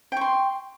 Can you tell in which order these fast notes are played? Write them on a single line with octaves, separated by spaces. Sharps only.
G5 C#6 C6